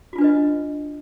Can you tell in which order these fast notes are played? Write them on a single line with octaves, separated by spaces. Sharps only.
F#4 F4 D4 B4 D#5